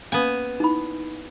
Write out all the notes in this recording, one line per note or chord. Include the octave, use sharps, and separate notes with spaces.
A#3 B3 C#4 F5 G#5
D#4 E4 B5